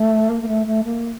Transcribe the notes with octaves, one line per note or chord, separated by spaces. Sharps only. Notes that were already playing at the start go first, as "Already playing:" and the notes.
Already playing: A3
A#3
A#3
A3
A3
A#3